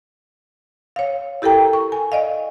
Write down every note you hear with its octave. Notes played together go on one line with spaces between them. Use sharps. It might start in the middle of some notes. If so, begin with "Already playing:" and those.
C#5 F5
E4 G4 A4 A#4 G5 A#5
C#6
G#5
D5 D#5 F5